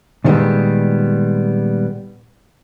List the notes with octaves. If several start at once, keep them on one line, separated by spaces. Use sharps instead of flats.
A#2 D#3 F3 G3 G#3 B3